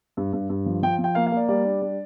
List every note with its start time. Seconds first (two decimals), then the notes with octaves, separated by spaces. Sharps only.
0.17 G2
0.33 G2
0.50 G2
0.66 F3
0.82 F3 G5
0.99 F3
1.04 G5
1.15 A#3 F5
1.27 F5
1.32 A#3 D5
1.48 G3 D5
1.65 D4
1.82 G3